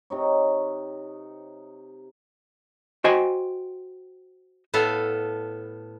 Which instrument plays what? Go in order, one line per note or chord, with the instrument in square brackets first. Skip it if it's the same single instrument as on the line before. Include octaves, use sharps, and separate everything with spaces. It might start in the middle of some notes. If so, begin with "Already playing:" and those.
[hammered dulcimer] C3 D#4 C#5
[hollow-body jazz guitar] F#4 C5 D#5 G5 G#5
[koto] A2 B3 A4 F5